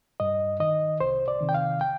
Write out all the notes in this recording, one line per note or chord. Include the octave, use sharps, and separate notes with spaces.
G2 D#5
D#3 D#5
C2 C5
D5
C3 D#3
G5
F5
G5